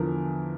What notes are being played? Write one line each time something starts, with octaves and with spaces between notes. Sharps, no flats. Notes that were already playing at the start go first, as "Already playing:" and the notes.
Already playing: E2 D3 F3 A#4